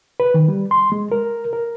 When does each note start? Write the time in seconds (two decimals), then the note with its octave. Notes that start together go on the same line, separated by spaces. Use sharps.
0.20 B4
0.34 D#3
0.48 G3
0.71 C6
0.92 G#3
1.12 A#4
1.53 A#4